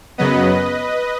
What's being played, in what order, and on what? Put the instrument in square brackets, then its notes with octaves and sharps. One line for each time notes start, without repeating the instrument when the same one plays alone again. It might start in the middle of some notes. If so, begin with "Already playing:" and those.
[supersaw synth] F#2 C#3 F#3 B3 B4 D#5